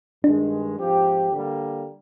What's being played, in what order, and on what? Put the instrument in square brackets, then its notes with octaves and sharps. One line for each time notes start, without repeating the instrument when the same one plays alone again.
[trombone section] G2 D#3 G#3 [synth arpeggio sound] D4
[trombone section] G#2 F3 C4 G4
D3 G3 A#3